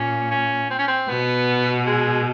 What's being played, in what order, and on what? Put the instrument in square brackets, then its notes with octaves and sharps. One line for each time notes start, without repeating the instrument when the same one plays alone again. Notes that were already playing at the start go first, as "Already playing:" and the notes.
Already playing: [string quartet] A#2 [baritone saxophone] C#4
[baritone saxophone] C#4
C4
C#4
C4
[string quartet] B2 [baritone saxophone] B3
[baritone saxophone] G#3